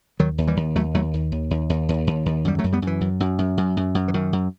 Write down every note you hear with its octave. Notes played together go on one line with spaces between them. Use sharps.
D#2 D#3 F#3
D#2
E3 G3
D#2
D#2 F#3 A3
D#2 F#3 A3
D#2
D#2
D#2
D#2
D#2
D#2
D#2
F#2 G3
F#3 A3
F#2
G3 B3
F#2 E3
F#2
F#2
F#2
F#2
F#2
F#2
E3
F#2 D#3
F#2